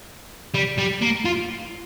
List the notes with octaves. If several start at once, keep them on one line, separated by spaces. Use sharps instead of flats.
G3
G3
A#3
F4